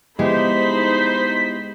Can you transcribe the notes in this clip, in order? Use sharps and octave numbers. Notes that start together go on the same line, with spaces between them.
G#3 B3 D#4 E4 G4 C5 B5 B6